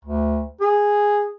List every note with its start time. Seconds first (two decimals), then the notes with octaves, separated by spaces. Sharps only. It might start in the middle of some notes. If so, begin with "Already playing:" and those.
0.05 D2
0.61 G#4